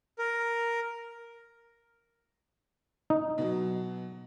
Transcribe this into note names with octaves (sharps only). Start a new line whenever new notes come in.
A#4
D#4
B2 F#3